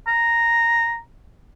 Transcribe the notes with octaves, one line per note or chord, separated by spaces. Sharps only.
A#5